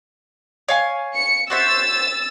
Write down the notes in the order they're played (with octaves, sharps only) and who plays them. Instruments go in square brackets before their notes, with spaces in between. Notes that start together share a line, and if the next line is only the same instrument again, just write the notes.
[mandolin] C#5 F5 G#5
[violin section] C#7
[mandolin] F#4 C5 E5 [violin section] E6 A6